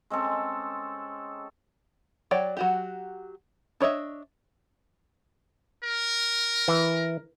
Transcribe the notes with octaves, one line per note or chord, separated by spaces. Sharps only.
G#3 C4 C#4 A4
F#3 C#5 D5 G5
F#3 F#4 G4
D4 C#5 D#5 E5
A#4
E3